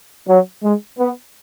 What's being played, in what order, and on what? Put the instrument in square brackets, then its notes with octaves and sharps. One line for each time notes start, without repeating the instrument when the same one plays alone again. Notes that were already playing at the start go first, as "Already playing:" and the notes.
[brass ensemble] F#3
G#3
B3